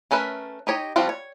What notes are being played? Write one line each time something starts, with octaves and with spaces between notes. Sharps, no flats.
A3 C#4 A#4 B4 E5
D#4 G4 C#5 D#5
F3 G3 C4 F4 F#4
C#5